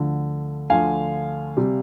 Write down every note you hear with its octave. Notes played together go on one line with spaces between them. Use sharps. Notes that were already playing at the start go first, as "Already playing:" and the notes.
Already playing: D2 D3 F3
D2 D3 F3 F5 G#5
C3 G3